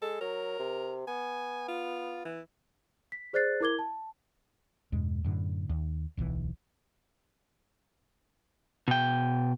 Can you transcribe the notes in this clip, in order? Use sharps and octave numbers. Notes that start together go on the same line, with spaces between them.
G#3 A4
F#3 A#4
C3
B3 G#5
F4
E3
B6
G#4 C5 D5 F#6 A6 C7
E4 A#4 D6 G#6 G7
A5
E2 G2 B2 G#3
F#2 A2 D3
D#2
D1 B1 B2 E3
B2 G5